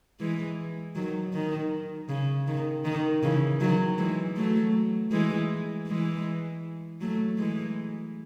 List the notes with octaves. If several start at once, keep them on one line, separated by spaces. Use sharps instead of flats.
E3 G#3
D#3 F#3
D#3
C#3
D#3
D#3
C#3 E3
D#3 F#3
E3 G#3
F#3 A3
E3 G#3
E3 G#3
F#3 A3
E3 G#3